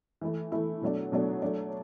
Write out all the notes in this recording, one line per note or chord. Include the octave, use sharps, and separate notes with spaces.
E3 A3 E4
E3 A3 E4
B2 F#3 A3 D4
B2 F#3 A3 D4
F#3 A3 D4